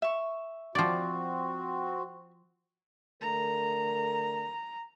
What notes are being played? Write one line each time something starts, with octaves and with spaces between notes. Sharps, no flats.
E5 C#6
F3 C4 F#4 D5
D3 A3 A#4 A#5